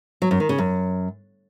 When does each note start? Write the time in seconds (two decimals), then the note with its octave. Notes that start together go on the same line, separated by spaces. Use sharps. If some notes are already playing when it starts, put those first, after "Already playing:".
0.22 F#3
0.31 F#2
0.40 D#3
0.49 C#3
0.58 F#2